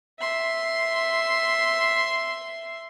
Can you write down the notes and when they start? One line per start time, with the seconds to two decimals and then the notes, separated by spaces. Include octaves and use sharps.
0.19 E5 C6